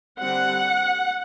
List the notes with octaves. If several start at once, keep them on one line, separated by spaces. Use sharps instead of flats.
D3 G3 C4 F#5